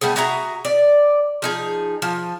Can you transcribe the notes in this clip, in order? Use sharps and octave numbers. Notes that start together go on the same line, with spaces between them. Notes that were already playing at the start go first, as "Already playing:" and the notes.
G3 A3 B3 G#4
F#4 G#4 E5 A#5
D5
F3 D#4 G#4
F3